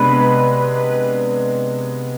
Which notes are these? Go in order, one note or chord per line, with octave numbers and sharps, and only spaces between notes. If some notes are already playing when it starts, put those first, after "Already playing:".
Already playing: C3 G#3 B3 D4 B4